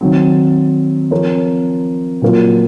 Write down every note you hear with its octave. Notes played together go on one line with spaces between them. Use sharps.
D#3 F#3 C4
F3 C4 F4 A#4 C#5
A#2 F#3 A#3 F4